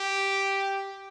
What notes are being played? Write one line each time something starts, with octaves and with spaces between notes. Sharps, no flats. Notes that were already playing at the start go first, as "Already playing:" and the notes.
Already playing: G4